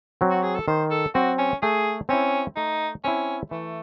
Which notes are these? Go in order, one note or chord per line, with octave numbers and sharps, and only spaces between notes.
F#3 C4
F#4
G#4
A4
D#3 C5
A4
F#3 C4 F#4
C#4
A3 G#4
C4 C#4 E4
A3 D#4
C4 C#4 E4
E3 A3